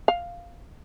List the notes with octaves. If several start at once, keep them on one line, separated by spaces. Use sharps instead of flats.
F5